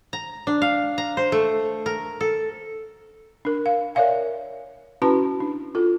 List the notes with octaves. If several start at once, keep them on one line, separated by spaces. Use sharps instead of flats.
A#5
D4
F5
A#5
C5
A3
A#4
A4
D4 A#4
F5
A#4 C#5 D5 E5 F5 G#5
C#4 E4 F#4 B4 A5 B5
D4
F4 A4